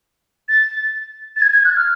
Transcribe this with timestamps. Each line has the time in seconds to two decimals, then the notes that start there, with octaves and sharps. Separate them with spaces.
0.49 A6
1.36 A6
1.42 G#6
1.53 G#6
1.65 F#6
1.77 F6